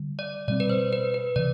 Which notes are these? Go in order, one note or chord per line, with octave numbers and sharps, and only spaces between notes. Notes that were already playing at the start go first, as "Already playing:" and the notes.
Already playing: D3 G3
D5
B2 G3 C4 D5
B4
C5
B4
B4
C3 E3 D5